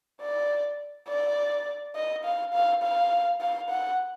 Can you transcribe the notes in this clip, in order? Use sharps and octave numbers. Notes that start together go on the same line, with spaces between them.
D5
D5
D#5
F5
F5
F5
F5
F#5